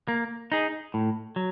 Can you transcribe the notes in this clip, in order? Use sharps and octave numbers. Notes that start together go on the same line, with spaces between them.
A#3
D#4 G#4
A2
F#3